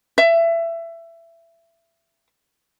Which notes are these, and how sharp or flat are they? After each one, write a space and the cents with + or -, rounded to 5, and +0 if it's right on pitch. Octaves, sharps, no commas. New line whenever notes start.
E5 +20